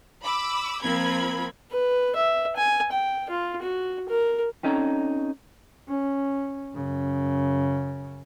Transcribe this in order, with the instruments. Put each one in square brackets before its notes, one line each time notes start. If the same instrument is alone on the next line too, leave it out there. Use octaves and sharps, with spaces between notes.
[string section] B5 D6 E6
F3 A#3 C4 A#4 B5 G#6
[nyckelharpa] B4
E5
G#5
G5
F4
F#4
A#4
[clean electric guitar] C4 C#4 D#4 A4 C#5 A#5
[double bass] C#4
F#2 C#3